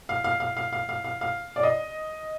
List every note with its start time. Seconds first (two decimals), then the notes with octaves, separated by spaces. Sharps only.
0.09 F5
0.24 F5
0.40 F5
0.57 F5
0.73 F5
0.89 F5
1.04 F5
1.21 F5
1.56 D5
1.63 D#5